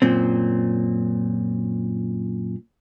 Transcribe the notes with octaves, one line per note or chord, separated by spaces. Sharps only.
F#2 A#2 C4